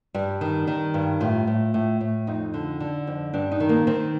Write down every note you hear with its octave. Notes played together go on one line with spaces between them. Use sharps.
G2 G3
D#3
D#3
G2
A2 F4
A2
A2
A2
F2 D#4
D3
D3
F2
G2 D4
D#4
D#3
A#3
D#3 C4